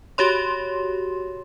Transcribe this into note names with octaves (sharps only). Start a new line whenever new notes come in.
F#4 G4 C#5 C6